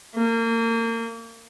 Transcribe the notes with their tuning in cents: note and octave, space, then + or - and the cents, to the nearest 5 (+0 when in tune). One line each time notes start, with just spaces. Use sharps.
A#3 -30